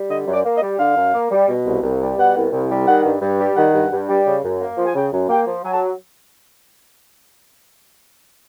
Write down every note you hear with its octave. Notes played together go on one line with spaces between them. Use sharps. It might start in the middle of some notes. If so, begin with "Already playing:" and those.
Already playing: G3
D3 D#5
F#2
D5
A#3
D#5
G3
D3 F5
F#2
A#3
G3
B2
C2
C2
G3
B2 F#5
C2
C2
G3
D#3 F#5
G2
G2
G3
D#3 F#5
G2
G2
G3
C#3
F#2
A#3
F3
G#5
C#3 G5
F#2
A#3 G5
F3
F#3 G#5
A5